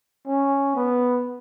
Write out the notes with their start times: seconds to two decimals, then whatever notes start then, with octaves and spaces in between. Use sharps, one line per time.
0.27 C#4
0.76 B3